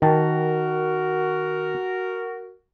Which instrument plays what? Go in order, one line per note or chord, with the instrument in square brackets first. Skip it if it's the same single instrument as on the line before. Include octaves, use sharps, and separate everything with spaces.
[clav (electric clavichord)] D#3 G5 A5 [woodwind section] F#4 A#4